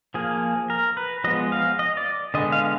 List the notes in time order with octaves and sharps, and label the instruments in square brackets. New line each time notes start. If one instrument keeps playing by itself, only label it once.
[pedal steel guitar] F3 A#3 G#4
A#4
B4
F3 G#3 B3 D#5
F5
D#5
D5
D3 G#3 B3 D#5
F5